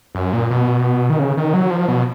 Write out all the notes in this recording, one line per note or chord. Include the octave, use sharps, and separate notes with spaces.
F#2
A#2
B2
D#3
C#3
D#3
F#3
F3
B2